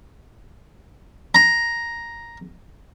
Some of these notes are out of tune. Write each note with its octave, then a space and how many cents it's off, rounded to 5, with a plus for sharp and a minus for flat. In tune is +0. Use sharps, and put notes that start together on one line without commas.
A#5 +5